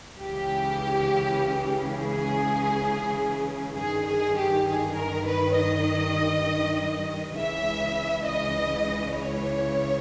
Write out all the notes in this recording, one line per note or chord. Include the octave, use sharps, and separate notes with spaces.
C#2 C#3 E3 G4
G#4
G2 D#3 G#4
G#4
G4
G#4
A#4
B4
D#5
C#2 C#3 E3 E5
D#5
C#5